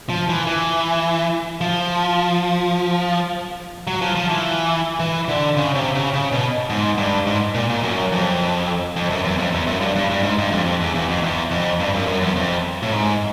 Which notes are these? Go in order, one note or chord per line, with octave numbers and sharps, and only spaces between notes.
F3
E3
E3
F3
F#3
F3
F3
E3
E3
D3
C#3
C3
C#3
C#3
B2
G#2
G2
G#2
A#2
A#2
F#2
F2
F2
F#2
E2
F2
E2
F#2
G2
G2
G2
G#2
G2
F2
F2
E2
E2
F2
E2
F2
G2
F#2
F#2
E2
F2
A2
G#2